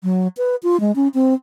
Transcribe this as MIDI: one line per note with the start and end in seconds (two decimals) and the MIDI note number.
0.03 0.28 54
0.37 0.56 71
0.63 0.80 65
0.80 0.94 56
0.95 1.08 61
1.14 1.34 60